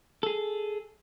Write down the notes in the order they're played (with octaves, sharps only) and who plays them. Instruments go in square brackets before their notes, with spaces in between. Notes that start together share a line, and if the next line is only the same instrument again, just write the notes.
[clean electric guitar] G#4 A4